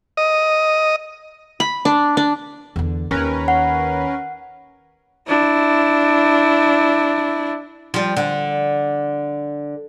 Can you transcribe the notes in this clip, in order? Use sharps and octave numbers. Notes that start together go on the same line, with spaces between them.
D#5
B5
D4
D4
E2 D3
D#2 C#4 A#4 B4
F#5
D4 E4
F3 G3
D3